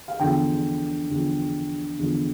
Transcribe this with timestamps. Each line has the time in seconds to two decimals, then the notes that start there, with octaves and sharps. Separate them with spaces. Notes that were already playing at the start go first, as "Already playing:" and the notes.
0.08 F5
0.20 E2 D3 F3 G5
1.10 E2 D3 F3
1.98 E2 D3 F3